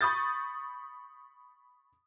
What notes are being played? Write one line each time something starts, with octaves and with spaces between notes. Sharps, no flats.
B5 C#6 D#6 G6 A6